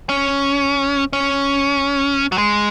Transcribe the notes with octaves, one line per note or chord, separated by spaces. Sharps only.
C#4
C#4
F#3
G#3